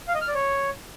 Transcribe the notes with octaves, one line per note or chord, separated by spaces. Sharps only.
F5
D#5
F6
D5
C#5